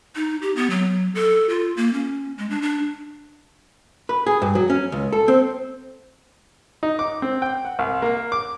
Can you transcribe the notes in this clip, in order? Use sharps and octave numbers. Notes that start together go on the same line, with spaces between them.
D#4
G4
B3
F#3
A4
F4
A#3
C#4
G#3
D4
D4
B4
G#4
G2
F#3
C#4
C#2
A4
C4
D#4
D6
C4
G5
F#5
C2
A#3
D6